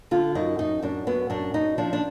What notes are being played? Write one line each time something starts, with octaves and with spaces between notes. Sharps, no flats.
D3 F4
F#2 D#4
F#2 D#4
F#2 D4
F#2 B3
F#2 D4
F#2 D#4
F3 D4
D4